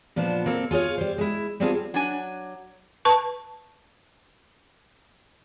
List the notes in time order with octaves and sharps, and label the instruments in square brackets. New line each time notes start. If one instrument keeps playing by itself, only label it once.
[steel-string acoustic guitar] A#2 F3 B3 D4 C5
A#3 C4 A4
F4 G#4 C#5 F5
G3 C5
G#3 E4
G3 B3 C4 D4 F4 G#4
[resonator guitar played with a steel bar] F#3 D4 G#5
[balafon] B4 A5 C#6